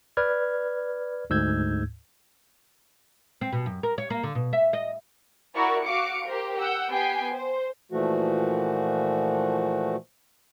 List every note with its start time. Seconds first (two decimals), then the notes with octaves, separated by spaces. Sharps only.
0.17 B4 D5 F6 G#6
1.30 D2 G#2 E6 G6 G#6
3.41 C4
3.52 B2
3.66 F#2
3.83 A#4
3.98 C#5
4.10 A#3
4.23 D3
4.35 B2
4.53 E5
4.73 D#5
5.55 E4 F#4 A#4 D5 C#6
5.86 F#4 F5 D6 C#7 D7
6.27 G4 A#4 C5
6.58 F#5 E6 G6
6.90 B3 G4 G5 G#5 C7
7.32 C5
7.92 A#2 E3 F3 A3 F#4